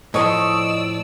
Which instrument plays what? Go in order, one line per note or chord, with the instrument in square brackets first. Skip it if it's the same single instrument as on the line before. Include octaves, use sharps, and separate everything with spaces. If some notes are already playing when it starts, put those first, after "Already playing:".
[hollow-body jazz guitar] A2 F3 [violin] D5 E6 [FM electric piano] D#5 C#6 D#6